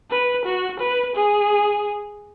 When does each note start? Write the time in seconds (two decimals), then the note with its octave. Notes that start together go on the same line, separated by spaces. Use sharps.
0.10 B4
0.45 F#4
0.80 B4
1.15 G#4